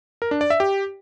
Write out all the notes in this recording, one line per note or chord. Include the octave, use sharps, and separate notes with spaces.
A#4
D4
D5
E5
G4